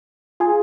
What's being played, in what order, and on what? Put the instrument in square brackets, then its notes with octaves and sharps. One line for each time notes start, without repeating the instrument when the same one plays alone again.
[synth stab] F4 G#4